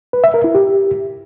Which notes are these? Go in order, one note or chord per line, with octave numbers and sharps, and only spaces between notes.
B4
E5
A#4
E4
G4